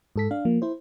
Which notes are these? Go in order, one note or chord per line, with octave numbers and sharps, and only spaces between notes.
G#2 A4 B6
D4 F5
F3 A#3
E4 C5